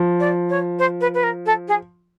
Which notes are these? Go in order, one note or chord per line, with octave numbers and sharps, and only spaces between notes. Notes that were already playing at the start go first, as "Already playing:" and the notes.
Already playing: F3
D5
C#5
C5
B4
B4
A#4
A4
G#4